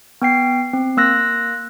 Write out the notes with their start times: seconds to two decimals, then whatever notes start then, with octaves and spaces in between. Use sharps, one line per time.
0.22 B3 G5 C7
0.73 C4
0.97 A#3 E6 F#6 A#6